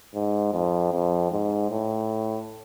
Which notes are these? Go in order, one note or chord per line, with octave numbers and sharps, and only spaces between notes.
G#2
F2
F2
G#2
A2